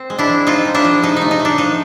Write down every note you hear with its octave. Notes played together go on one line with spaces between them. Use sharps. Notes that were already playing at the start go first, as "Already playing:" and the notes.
Already playing: C4
G#3
D4 E4
F3
C4 D#4 F4
G#3
D4 E4
F3
C3 D#4
D#4
A3
D#4
A3
D4
F3 D#4